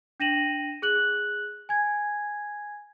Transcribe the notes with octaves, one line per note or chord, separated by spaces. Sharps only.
D4 G5 A#6 D#7 E7 F#7
G#4 F#6 F#7
G#5 G#6